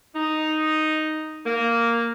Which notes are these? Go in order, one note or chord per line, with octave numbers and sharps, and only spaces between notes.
D#4
A#3